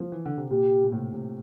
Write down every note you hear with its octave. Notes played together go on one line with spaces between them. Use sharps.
F3
E3
D3
C3
A#2 G4
A#2
A2 C3
A#2
A2 C3